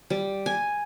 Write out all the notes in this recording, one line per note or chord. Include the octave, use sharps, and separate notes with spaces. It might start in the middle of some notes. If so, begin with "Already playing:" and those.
G3
G#5